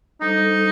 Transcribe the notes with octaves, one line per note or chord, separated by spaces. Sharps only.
G3 D4 D#4 A4 C5